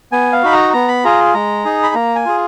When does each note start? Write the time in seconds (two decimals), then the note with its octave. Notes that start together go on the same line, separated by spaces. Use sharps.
0.12 B3 G#5
0.33 F5
0.43 D#4 F#4 B5
0.53 A#5
0.73 B3 A#5
0.88 B5
1.04 F4 G#4 A#5
1.34 G#3 A#5
1.65 D#4 G#4
1.83 B5
1.94 A#3 A#5
2.15 G#5
2.25 F4 G#4